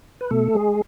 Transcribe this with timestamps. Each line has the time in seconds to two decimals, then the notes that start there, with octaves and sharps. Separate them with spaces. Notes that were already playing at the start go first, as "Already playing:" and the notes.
0.21 B4
0.31 B2 A3 A4
0.55 G#3 G#4